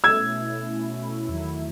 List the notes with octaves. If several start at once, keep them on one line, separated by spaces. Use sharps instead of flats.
B2 A3 C#4 E4 E6 G#6
E2 D#3 F#3 A3 E4